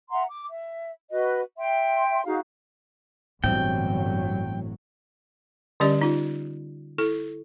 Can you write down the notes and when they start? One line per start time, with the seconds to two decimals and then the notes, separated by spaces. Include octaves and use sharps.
0.10 E5 F#5 A#5 C6
0.29 D6
0.50 E5
1.10 F#4 B4 D#5
1.58 E5 G5 C6
2.25 D#4 F#4 G#4 F5
3.44 G1 A2 D3 E3 F#3 C4 G5
5.80 D3 G3 C#4 G4 D5 D#5
6.01 D#4 F4
6.98 E4 A4